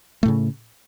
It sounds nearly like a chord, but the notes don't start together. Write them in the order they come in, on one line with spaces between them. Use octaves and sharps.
A3 A2 C#3